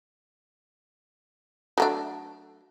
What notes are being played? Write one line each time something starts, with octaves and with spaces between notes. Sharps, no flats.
F#3 A3 D4